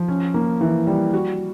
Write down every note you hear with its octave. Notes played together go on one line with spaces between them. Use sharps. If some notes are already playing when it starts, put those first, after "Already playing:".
Already playing: F3
C#4
A#3
E3
G3
F#4